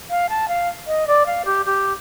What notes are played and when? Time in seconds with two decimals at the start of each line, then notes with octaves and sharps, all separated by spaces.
0.10 F5
0.29 A5
0.48 F5
0.87 D#5
1.07 D5
1.26 F5
1.45 G4
1.65 G4